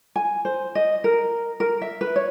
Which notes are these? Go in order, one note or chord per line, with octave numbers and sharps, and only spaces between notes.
G#5
C5
D#5
A#4
A#4
E5
B4
C#5